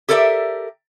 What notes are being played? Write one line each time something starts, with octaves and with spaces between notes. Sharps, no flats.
G4 A4 A#4 C#5 D5 E5